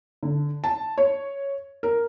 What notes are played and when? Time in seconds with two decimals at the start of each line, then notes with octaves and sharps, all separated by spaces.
0.23 D3
0.64 A5
0.98 C#5
1.83 A#4